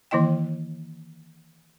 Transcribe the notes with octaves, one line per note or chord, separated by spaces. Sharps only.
D#3 E3 A#3 E4 D#5 G5